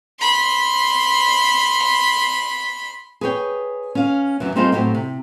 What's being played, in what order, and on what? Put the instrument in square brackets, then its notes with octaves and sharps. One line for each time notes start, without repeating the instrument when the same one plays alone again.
[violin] B5 C6
[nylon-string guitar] G#4 B4 C#5 G5
C#4 F5
F#2 E3
G3 C4 D#4 F4 G#4 A4
A2 F#3 C4 G4
C3